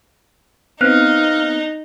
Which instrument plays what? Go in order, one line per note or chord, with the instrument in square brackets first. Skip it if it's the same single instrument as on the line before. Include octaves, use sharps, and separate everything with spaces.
[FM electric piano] B3 C4 [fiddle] D#4 [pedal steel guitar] F5 [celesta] F#6